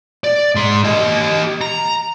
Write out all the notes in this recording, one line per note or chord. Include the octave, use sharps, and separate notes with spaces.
D5
G#2 C6
G4 D#5
A#5